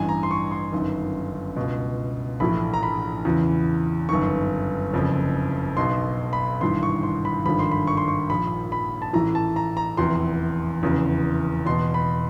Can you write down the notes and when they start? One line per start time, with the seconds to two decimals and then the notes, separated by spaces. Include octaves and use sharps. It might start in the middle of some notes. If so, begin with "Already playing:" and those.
Already playing: A1 G2 E3 G#5
0.09 A#5
0.23 C6
0.31 C#6
0.51 C6
0.72 G1 F#2 D#3
1.56 C#2 B2
2.40 A#1 A2 E3 B5
2.74 A#5
2.83 B5
3.25 E2 C#3 E3
4.09 G1 F#2 D#3 C#6
4.93 F#1 F2 C#3 F3
5.77 B1 B2 C6
6.33 B5
6.61 G#1 G2 E3 C6
6.83 C#6
7.03 C6
7.25 B5
7.45 G#1 G2 D3 F3 B5
7.59 C6
7.71 B5
7.87 C#6
7.97 C6
8.08 C#6
8.30 A#1 A#2 F3 B5
8.72 B5
9.02 A5
9.13 A1 A2 E3 A#5
9.35 A5
9.56 A#5
9.77 A#5
9.97 F1 E2 C3 E3 C6
10.82 F1 E2 C#3 E3
11.66 E2 B2 C6
11.94 B5